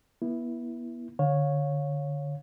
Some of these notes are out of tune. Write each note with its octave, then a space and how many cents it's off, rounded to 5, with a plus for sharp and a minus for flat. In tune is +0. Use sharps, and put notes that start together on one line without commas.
B3 -35 E4 +0
D3 +0 C#5 -5 F5 +25